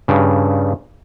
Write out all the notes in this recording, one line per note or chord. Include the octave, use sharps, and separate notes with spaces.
G2 C#3